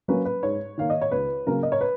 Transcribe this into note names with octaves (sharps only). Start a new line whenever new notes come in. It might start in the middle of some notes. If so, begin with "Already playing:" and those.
F#3 A#3 C#4 B4
B4
G#2 C#5
D#3 A#3 F5
D#5
C#5
C#2 B4
C#3 F#3 A#3 C#4 A#4
D#5
C#5
B4